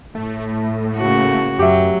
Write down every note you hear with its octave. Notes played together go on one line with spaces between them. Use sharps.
A2 A3
C#3 A#3 F#4
F#2 F#3 G4 E5